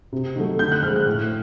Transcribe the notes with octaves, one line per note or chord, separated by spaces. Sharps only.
C3
D#3 F#3 A3
D3 G6
F#6
F3 G#3 F6
F#6
A2